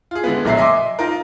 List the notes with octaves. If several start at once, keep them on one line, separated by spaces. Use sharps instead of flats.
F4 G#4
D3 E3 G#3 B3
B1 A#2 F#3 E5 E6 C7
D#5 E5 G#5 C6 D6
D#4 F4 A#4